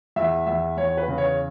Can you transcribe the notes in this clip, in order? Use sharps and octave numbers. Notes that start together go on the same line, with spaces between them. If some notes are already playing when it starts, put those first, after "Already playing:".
E2 E5
E2 E5
E2 C#5
B4
C#3
C#5